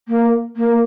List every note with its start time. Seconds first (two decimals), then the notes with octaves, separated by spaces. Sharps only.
0.08 A#3
0.56 A#3